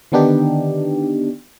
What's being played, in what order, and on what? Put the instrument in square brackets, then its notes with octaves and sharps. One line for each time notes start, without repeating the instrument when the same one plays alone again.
[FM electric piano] D3 D#3 B3 D4 D#4 G4